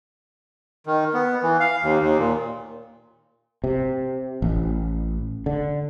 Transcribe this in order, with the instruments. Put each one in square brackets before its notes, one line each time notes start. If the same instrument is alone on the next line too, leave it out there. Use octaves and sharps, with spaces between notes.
[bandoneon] D#3
B3
E3
F5
D#2
D#2
A#2
[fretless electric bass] C3
A1
D3